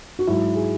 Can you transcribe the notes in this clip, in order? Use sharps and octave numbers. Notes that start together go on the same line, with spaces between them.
F#4
G#2 F#3 E4
G#4